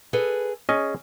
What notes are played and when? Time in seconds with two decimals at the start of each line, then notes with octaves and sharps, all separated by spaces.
0.13 G#4 A4 B4
0.69 C#4 G#4 D#5